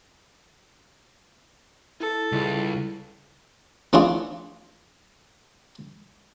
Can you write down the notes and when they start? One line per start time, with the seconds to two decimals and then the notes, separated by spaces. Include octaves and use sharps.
2.00 E4 A4
2.32 C#2 G3 E4 G#4
3.93 E3 A3 D4 E4 F4 G#4